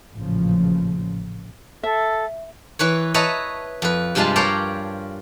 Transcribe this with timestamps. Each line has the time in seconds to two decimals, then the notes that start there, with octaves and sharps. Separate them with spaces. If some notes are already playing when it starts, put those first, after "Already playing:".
0.14 A1 A#2 C#3 F3
1.83 A4 E5
2.79 E3 B4 C#5
3.14 B4 C#5 D#5 E5 A5 A#5
3.82 F2 B4
4.15 G2 C3 G3 G#3 F4 A5
4.36 A#4 C#5 D5 F5 G5 A5